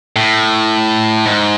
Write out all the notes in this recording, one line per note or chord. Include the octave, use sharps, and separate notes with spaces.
A2
G#2